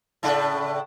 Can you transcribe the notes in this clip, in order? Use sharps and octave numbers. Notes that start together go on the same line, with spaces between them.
A2 C#3 D4